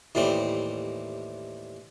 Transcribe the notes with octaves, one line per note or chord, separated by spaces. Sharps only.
D#2 A2 E3 G3 C4